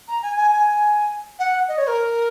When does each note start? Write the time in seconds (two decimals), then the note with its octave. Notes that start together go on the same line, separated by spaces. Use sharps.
0.08 A#5
0.23 G#5
0.37 G#5
0.51 G#5
1.39 F#5
1.68 D#5
1.78 C#5
1.87 A#4